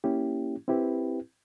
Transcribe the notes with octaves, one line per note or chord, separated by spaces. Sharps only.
A#3 C#4 E4 G4
C4 E4 G4 B4